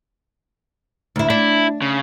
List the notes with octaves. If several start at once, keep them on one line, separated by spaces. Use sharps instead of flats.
D2 E4
D4 E4
C#3